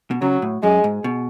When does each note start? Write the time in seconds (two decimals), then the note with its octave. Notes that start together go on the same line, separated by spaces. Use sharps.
0.11 B2
0.21 C#3 F#3
0.42 A2
0.63 F#2 G#3
0.84 G#2
1.04 B2